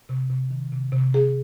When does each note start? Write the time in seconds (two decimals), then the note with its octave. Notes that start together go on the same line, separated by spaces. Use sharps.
0.09 C3
0.30 C3
0.51 D#3
0.72 C3
0.92 C3
1.13 C3 G#4